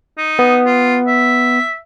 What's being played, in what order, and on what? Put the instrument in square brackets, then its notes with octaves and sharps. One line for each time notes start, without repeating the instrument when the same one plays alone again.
[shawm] D#4
[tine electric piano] B3
[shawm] F4
E5